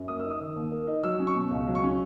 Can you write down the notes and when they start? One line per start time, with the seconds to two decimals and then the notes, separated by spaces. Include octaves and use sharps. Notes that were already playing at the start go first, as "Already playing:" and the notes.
Already playing: F#2
0.08 A#3 D#6
0.20 D#4 E6
0.30 D#6
0.40 D#3
0.56 D#2
0.72 A#3
0.87 D#4
1.03 F#3 E6
1.19 C#4
1.27 C#6
1.35 B2
1.51 C#2
1.67 F#3
1.75 C#6
1.84 C#4